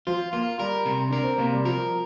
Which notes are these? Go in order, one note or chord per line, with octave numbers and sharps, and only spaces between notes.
F3 F4
A#3 F4
G3 A#4
C3
D4 A#4
C4
C3 A#3
G3
F3 A#4